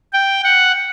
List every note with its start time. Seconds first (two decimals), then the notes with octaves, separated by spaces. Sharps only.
0.13 G5
0.44 F#5